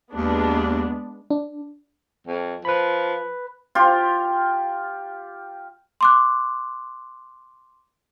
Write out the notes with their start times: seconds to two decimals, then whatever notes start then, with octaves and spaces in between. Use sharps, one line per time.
0.15 D#2 G#3 B3 D4
1.30 D4
2.27 F2
2.65 F3 B4 B5
3.75 F4 G4
6.01 C6 D6 F#6